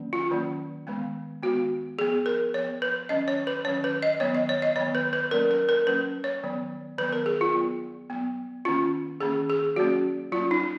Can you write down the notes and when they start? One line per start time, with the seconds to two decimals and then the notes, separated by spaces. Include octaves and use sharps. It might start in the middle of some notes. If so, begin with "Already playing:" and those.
Already playing: D#3 F#3 A#3 C#4
0.13 F4
0.31 D#3 F#3 A#3 C#4
0.87 D#3 G#3 B3
1.42 D#3 G#3 B3 F#4
1.98 F3 B3 G#4
2.26 A#4
2.54 F3 C#5
2.58 B3
2.82 B4
3.09 D#3 F#3 C#4 D#5
3.28 C#5
3.47 B4
3.65 D#3 F#3 C#4 C#5
3.84 B4
4.03 D#5
4.20 D#3 F#3 B3 C#5
4.35 D#5
4.49 C#5
4.62 D#5
4.76 D#3 F#3 B3 C#5
4.95 B4
5.13 B4
5.31 F#3 A#3 C#4 A#4
5.51 A#4
5.69 A#4
5.87 F#3 A#3 C#4 B4
6.24 C#5
6.43 D#3 F#3 B3
6.98 D#3 F#3 B3 B4
7.13 A#4
7.26 G#4
7.41 F4
7.54 F#3 B3
8.10 F#3 B3
8.65 D#3 A#3 C#4 F4
9.21 D#3 A#3 C#4 G#4
9.50 G#4
9.76 F#3 A#3 C#4 F#4
10.32 F#3 A#3 C#4 F4
10.51 D#4